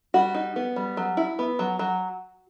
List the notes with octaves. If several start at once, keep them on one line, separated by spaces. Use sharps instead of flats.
G3 F#4
D#4
B3
G3
F#3
E4
B3
F#3
F#3